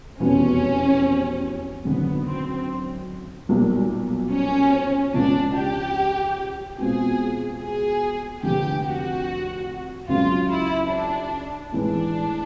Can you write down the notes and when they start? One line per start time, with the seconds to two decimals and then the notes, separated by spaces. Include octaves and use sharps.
0.20 F1 E2 B2 C#4
1.85 G#1 F#2 D3 B3
2.26 C4
3.49 B1 A#2 G3 A#3 D#4
4.31 C#4
5.14 C#2 C#3 F3 D4
5.55 G4
6.78 B2 G#3 C4 F4 G#4
7.60 G#4
8.43 F1 F2 D3 G4
8.84 F#4
10.08 C#2 C#3 F#3 F4
10.50 E4
10.90 D4
11.72 A2 E3 G#3 D4